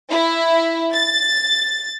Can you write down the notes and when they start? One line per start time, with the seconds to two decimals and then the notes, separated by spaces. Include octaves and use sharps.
0.10 E4
0.95 A6